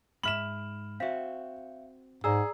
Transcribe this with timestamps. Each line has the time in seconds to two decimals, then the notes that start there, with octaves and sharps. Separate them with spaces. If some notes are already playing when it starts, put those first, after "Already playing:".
0.23 G#2 E5 B5 F6 E7 F#7
1.00 C4 F#4 E5 F5
2.24 G#2 G#4 D5 A#5 E6